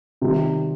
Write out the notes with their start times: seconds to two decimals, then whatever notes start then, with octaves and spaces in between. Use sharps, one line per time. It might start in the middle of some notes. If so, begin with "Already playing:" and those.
0.22 C3 D#3 G3